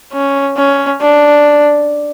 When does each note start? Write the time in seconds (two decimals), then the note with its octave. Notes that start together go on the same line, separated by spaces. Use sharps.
0.13 C#4
0.57 C#4
1.01 D4